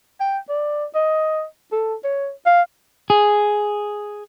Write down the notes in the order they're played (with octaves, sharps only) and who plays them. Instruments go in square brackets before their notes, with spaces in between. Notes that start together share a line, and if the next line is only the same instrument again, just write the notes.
[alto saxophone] G5
D5
D#5
A4
C#5
F5
[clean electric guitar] G#4